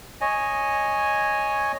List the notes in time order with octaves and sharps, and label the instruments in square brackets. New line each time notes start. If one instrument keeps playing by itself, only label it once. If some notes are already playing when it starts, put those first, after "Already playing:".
[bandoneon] C#5 D#5 G#5